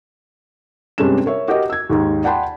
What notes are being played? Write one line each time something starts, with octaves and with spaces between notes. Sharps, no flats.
G2 C3 G#3 C#4 D4 E7
A#4 C#5 E5
F#4 G4 A#4 D#5
E6 G#6
D#2 G#2 D#3
D5 F#5 G5 A5 B5 C6